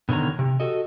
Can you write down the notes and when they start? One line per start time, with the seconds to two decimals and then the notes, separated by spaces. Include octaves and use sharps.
0.09 B2 D3 D#3 C#5 A#5
0.39 C3
0.60 F#4 A4 D#5